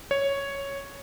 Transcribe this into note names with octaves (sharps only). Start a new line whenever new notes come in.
C#5